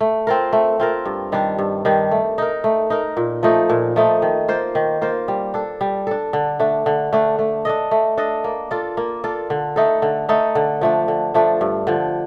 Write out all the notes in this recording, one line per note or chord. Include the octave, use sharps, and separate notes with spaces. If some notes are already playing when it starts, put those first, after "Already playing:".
A3
C4 F4 A#4
A3
C4 F4 A#4
G2
D#3 G3 D4
G2
D#3 G3 D4
A3
D#4 A#4
A3
D#4 A#4
A#2
F3 A3 D#4
A#2
F3 A3 D#4
D#3
A#3 F4 C5
D#3
A#3 F4 C5
G3
D4 A4
G3
D4 A4
D3
A3 D4
D3
A3 D4
A3
D4 A4 D#5
A3
D4 A4 D#5
A#3
F4 A4 D5
A#3
F4 A4 D5
D3
A3 D#4 A4
D3
A3 D#4 A4
D3
F3 A3 D4
D3
F3 A3 D4
G2
D3 F3